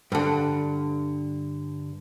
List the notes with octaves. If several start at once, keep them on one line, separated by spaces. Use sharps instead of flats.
G2 D3